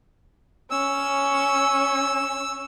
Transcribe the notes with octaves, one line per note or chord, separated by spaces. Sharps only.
C#4 E6